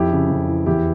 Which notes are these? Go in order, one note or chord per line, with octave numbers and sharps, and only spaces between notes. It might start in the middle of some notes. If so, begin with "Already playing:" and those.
Already playing: F2 E4 G4
C#3
F2
E3
E2 E4 G4